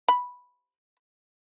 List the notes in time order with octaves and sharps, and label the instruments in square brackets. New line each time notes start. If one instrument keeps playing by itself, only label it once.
[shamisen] B5